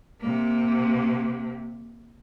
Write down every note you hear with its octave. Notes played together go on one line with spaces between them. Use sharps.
C3 A#3